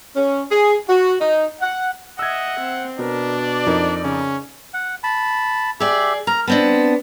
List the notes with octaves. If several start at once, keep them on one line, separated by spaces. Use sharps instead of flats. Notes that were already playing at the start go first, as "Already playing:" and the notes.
C#4
G#4
F#4
D#4
F#5
D#5 E5 F#5 E6 G#6
C4
B2 D4 A#4
D5
F2 D#4 A#4
C#3 C#4
F#5
A5 B5
G4 G#4 D5 E5
A#4 A#5
B3 C4 D4 A5